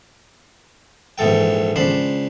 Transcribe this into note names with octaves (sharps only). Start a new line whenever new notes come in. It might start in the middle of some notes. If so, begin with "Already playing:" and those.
A#1 G#2 E3 A4 G5
C#2 D4 C5 B5